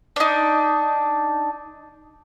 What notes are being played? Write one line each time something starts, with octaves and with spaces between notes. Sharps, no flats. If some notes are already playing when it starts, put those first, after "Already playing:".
D4 D#4